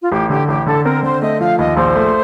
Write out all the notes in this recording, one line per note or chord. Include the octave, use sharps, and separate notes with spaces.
F4
A1 G4
D3 G4
A1 G4
D3 A4
C4 A#4
D3 C5
A3 D#5
F3 F5
D#2 D#5
A#1 C5
A3